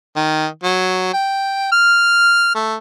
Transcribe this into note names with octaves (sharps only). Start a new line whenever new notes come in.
D#3
F#3
G5
F6
A3